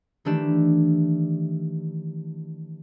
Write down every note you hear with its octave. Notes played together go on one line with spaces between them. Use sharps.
D#3 E3 A3 D4 G4 E7